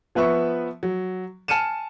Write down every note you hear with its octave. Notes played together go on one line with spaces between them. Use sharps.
F3 B3 B4 E5 C#6
F#3
G#5 A5 F6 C#7 D#7 E7